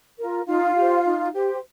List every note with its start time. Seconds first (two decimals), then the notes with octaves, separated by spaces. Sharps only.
0.18 F4 A#4
0.47 D#4 F4 F5
0.76 G4 C5
1.05 D#4
1.34 G4 C5